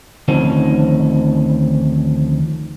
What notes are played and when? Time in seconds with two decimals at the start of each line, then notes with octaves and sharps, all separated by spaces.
0.28 D2 D#3 F3 C4 C#4